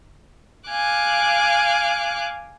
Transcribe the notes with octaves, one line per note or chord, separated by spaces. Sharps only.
F5 G#5 D6 F#6